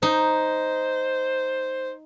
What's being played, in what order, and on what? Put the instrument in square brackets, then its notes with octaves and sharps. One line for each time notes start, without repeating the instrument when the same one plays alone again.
[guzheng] D#4 [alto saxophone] C5